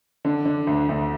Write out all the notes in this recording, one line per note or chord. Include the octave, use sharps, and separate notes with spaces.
D3
D3
D2
D2